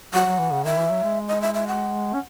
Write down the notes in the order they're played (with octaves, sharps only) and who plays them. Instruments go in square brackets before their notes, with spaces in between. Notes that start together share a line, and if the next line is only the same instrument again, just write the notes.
[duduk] F#3 [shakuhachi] F#5
[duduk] F#3
E3
C#3
[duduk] D#3 [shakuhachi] E5
[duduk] E3
F#3
G#3
[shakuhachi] D#5
E5
E5
F#5
[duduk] C#4